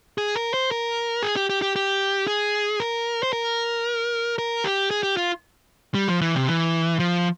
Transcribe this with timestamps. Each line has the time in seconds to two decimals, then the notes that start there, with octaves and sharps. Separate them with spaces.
0.18 G#4
0.36 A#4
0.54 C5
0.71 A#4
1.23 G#4
1.36 G4
1.50 G4
1.62 G4
1.76 G4
2.27 G#4
2.80 A#4
3.23 C5
3.33 A#4
4.38 A#4
4.64 G4
4.91 G#4
5.03 G4
5.17 F4
5.95 G3
6.08 F3
6.21 E3
6.35 C3
6.48 E3
7.00 F3